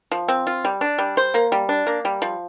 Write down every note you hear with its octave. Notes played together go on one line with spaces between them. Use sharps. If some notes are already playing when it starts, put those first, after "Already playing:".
F3
C4
F4
G3
D4
G3
C5
A#3
G3
D4
A#3
G3
F3